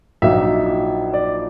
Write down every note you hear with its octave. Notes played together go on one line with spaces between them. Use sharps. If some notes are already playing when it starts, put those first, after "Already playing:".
A#1 A#2 F#3 A#3 D#4 E5
D5